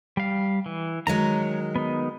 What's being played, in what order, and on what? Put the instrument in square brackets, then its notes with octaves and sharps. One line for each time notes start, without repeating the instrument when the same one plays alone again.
[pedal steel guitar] G3 F5
E3
[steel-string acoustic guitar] D#3 F#3 G#3 [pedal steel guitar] C#5 A#5
[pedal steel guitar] B3 D#4